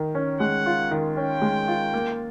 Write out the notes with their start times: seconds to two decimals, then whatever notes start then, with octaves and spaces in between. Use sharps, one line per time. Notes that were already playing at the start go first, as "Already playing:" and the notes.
Already playing: D#3
0.15 C#4
0.40 G#3 F#5
0.66 F4
0.91 D#3
1.17 C#4 G5
1.42 G#3
1.68 F4
1.94 A#3